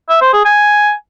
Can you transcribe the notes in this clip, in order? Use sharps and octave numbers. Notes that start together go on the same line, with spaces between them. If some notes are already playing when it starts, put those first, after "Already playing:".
E5
C5
G#4
G#5